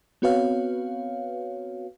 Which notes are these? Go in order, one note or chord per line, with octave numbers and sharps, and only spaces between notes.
B3 C4 F#4 B4 C#5 F5